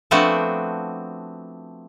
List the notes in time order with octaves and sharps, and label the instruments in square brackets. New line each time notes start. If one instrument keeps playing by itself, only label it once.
[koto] F3 A3 B3 C4 D4 F#4